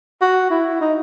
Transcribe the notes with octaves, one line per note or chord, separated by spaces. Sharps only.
F#4
E4
D#4